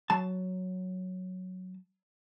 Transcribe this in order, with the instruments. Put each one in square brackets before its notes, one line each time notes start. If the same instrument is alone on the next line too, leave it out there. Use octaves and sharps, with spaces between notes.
[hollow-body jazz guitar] F#3 A5